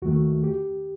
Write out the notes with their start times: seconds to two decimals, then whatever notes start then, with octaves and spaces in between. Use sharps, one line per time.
0.02 D#2 D#3 A3 F#4
0.44 G4